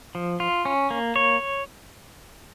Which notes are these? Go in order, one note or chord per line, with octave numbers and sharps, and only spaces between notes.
F3
F4
C#4
A#3
C#5